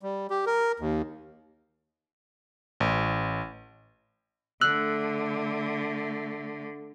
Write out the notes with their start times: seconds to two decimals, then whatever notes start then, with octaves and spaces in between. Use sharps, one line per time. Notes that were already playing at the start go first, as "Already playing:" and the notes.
0.03 G3
0.30 G4
0.46 A#4
0.80 D#2
2.80 A1
4.61 D3 A3 E6 F#6 F#7